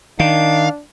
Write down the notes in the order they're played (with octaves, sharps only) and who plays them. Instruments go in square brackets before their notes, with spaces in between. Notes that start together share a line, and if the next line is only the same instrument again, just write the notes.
[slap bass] D#3 [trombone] D4 [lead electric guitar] F5